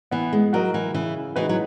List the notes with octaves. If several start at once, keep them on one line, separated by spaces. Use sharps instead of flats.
E3 B3
G#3
F#3 F#4 A#4 D#5
E3
C#3 E3
E3 G#3 D#4 F#4 B4
F#3